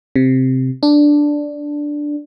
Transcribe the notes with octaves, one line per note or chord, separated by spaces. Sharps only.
C3
D4